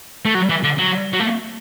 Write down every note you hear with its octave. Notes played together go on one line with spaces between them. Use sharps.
A3
F#3
E3
D3
F#3
F#3
A3